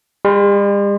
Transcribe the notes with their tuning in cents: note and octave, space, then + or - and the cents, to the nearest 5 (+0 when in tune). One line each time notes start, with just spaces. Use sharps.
G3 +45 C6 +5